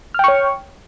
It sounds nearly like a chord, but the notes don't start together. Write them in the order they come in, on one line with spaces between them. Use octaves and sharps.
F6 G5 C#6 C#5